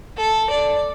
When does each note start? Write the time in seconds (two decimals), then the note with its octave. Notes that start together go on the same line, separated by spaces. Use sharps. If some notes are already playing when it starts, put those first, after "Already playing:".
0.17 A4
0.50 D5